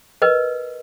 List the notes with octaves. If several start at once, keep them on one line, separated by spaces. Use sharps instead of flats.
A#4 B4 D#5